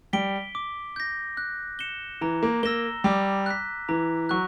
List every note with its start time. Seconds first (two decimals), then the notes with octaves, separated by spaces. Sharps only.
0.13 G3 B6 D7 G7
0.55 D6
0.96 G6 A#6
1.37 F#6
1.79 C#7 E7 G7
2.21 E3 A#5
2.43 A#3
2.63 A#3 E6 A#6 E7 G7
3.04 G3 D6
3.46 F#6 B6
3.89 E3 A#5
4.29 F#3 C#6 F#6